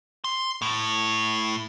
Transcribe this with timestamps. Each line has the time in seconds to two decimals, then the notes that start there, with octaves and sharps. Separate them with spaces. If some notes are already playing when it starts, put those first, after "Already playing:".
0.24 C6
0.62 A2